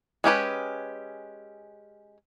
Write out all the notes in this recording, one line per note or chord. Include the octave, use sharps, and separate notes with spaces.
G#3 C#4 G4 B4